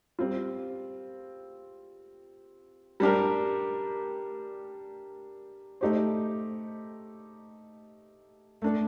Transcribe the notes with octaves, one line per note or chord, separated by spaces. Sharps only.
G3 C4 F4
G3 D4 G4 A#4
A3 D#4 G4 C5
A3 D4 A4